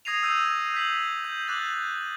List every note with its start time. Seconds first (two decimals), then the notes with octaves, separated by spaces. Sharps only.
0.05 D#6 G#6 A#6 C7 D#7 F7
0.22 D#6 E6 G6 G#6 D#7 F7
0.74 G6 B6 F#7
1.24 G6
1.47 D6 F#6 A6 F#7